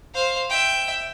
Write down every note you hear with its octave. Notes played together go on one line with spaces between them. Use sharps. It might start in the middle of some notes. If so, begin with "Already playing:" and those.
C5 F5
E5 G5